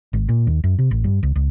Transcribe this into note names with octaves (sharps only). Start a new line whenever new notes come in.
G#1
A#2
D#2
F#2
C3
A1
G2
C#2
C#2